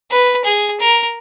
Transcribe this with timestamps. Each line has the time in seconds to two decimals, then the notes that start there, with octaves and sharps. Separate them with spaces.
0.10 B4
0.45 G#4
0.80 A#4